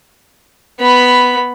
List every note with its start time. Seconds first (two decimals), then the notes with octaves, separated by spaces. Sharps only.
0.80 B3 B5